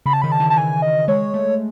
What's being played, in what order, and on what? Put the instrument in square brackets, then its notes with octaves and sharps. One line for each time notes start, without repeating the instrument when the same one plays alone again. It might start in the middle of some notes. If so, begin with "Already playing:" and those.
[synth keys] C#3 [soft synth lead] B5
[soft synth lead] A5
[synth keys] D#3 [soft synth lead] B5
[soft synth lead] A5
[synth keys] E3
[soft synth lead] A5
[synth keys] E3 [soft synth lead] G#5
[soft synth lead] D#5
[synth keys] G#3 [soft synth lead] C#5
[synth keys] A3